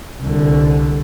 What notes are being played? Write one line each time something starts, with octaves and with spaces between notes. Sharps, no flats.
C2 D3